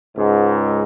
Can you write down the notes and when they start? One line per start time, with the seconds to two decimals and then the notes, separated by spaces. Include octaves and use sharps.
0.17 C#2 G#2